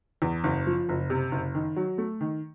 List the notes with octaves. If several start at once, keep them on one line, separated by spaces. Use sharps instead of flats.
E2
F#1
F3
F#1
C3
F#1
D#3
F#3
A3
D#3